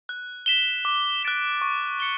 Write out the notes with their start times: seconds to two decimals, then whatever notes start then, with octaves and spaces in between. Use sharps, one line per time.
0.09 F#6
0.46 B6 E7 G7
0.85 D6
1.23 F#6 A6 D7 G7
1.62 C#6
2.00 C#7 G7